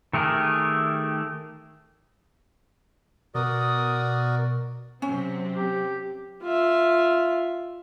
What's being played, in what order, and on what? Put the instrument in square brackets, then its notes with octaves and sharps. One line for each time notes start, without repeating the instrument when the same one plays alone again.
[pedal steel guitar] D#3 A3 G4 G#4 A#4
[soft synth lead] B2 [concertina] F#4 A#4 D5 [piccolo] D#6
[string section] C3 F#3 C4 [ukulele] C#4
[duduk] G4
[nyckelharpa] F4 E5